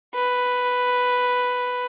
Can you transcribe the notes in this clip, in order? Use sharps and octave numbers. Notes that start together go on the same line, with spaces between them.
B4